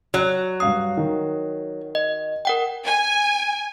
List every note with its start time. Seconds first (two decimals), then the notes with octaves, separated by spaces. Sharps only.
0.14 F#3 F#6
0.60 G2 F5 D#6 C7
0.97 D#3
1.95 D#5
2.45 A#4 F#5 G5
2.85 G#5